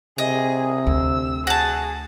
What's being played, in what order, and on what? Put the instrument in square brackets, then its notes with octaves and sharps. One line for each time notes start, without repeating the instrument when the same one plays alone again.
[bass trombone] C3 [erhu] G#4 [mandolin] D#5
[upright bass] D2 [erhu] E6
[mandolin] F#4 A5 [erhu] G#4